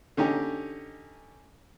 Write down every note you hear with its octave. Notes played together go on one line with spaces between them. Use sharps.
D3 C#4 D#4 G4